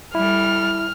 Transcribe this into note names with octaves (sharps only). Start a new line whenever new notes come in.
G3 E4 A4 F6